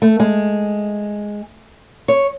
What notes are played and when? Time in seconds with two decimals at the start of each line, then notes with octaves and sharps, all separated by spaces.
0.02 A3
0.20 G#3
2.08 C#5